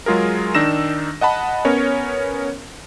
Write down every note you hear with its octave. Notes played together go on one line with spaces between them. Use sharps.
F#3 G#3 F4 G#4 A#4
D#3 D4 D#4 E6 A#6 E7
D#5 F#5 A5 B5
B3 C#4 A#4 C#5